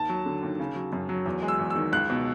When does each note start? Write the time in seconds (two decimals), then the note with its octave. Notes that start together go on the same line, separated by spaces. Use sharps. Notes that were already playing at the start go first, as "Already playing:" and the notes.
Already playing: D#2 A5
0.09 F#3
0.26 D3
0.43 D#2
0.60 C#3
0.76 F#3
0.93 F#2
1.09 F#3
1.26 E2
1.42 G#3
1.48 E6
1.59 E2
1.70 E6
1.76 D#3
1.92 C#2 F#6
2.10 B2